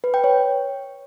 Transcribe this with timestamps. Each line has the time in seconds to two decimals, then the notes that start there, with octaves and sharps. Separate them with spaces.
0.04 B4
0.14 G5
0.24 C#5